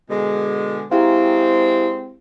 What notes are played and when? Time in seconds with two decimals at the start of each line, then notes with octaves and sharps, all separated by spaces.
0.10 B2 D3 G#3
0.92 G#3 C4 E4 G4 F5